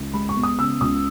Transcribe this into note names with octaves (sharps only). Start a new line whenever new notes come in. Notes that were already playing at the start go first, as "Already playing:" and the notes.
Already playing: C#2
G#3 B5
C#6
B3
D#6
C#3 E6
C#2 D#6